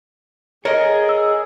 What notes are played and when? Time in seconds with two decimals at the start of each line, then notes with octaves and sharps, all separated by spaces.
0.65 G#4 A#4 C#5 D#5
1.09 E6